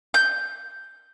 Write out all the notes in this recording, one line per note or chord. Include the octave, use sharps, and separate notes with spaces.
G6